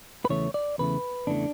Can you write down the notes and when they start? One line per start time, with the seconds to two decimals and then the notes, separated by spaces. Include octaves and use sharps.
0.25 B4
0.29 E2 C#3 E3 A3 C#5
0.54 D5
0.78 E2 C#3 E3 A3 B4
1.27 E2 C#3 E3 A3 D4